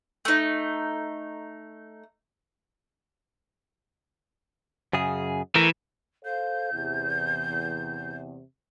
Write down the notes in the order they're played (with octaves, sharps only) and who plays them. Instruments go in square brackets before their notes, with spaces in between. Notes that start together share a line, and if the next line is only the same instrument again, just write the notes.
[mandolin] A3 D#4
[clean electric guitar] F#2 C#3 G#4
[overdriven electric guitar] E3 [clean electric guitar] A3 A#4
[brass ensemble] A4 C5 F5 [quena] G6
[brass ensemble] E2 C3